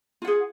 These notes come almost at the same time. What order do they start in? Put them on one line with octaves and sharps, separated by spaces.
F4 F#5 G#4